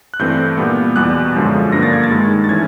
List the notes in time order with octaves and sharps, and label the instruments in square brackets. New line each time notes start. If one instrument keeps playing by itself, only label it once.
[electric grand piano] F#6
G2 E3 A3 C4 G6
A#2 G3 B3
E2 B2 G3 F#6
F#2 D3 F3 G#3
G2 D3 F3 A#3 A#6
A6
G#6
A6
G2 D#3 G#3
A6
E3 A3 C#4 G#6